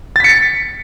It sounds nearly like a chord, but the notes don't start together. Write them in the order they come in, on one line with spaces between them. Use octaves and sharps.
A6 B6 C#7